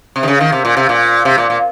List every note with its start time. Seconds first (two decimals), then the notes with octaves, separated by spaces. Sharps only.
0.16 C3
0.23 D#3
0.28 C#3
0.41 D#3
0.52 C3
0.65 A#2
0.77 C3
0.89 A#2
1.25 C3
1.38 A#2
1.50 A#2